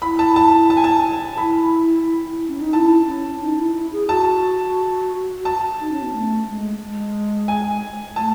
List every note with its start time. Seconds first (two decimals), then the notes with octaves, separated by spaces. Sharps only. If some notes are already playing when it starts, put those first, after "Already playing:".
0.02 E4 B5
0.19 A5
0.36 A5
0.70 A5
0.77 G#5
0.84 A5
1.38 E4 B5
2.48 C#4
2.60 D#4
2.73 E4 A5
3.07 C#4
3.41 D#4
3.58 E4
3.75 E4
3.92 G#4
4.09 F#4 A5
5.45 A5
5.80 D#4
5.91 C#4
6.02 B3
6.13 A3
6.47 G#3
6.80 G#3
7.48 G#5
8.16 A3 A5